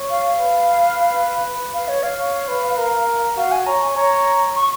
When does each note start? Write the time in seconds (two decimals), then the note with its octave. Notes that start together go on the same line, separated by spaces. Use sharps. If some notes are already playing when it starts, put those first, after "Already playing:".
Already playing: C#5
0.10 F5
0.39 B4
1.74 F5
1.88 C#5
2.03 F5
2.18 C#5
2.48 B4
2.77 A#4
3.37 F#4 F5
3.51 G#5
3.66 C#5 A#5
3.82 G#5
3.96 C#5 A#5
4.55 C#6